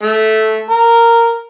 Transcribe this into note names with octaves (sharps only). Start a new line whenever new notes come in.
A3
A#4